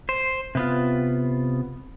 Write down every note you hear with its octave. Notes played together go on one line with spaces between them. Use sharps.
C5
C3 B3 F4